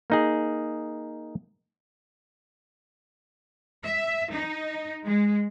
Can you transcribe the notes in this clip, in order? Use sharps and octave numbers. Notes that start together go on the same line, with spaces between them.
A#3 D#4 G#4
E5
D#4
G#3